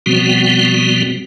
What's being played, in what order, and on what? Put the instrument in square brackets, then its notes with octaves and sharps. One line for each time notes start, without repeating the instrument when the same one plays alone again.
[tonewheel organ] B2 F3 G3 B3 C4 F#4